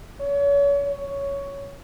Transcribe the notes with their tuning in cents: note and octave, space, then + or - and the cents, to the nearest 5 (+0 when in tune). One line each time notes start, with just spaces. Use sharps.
C#5 +35
C#5 +10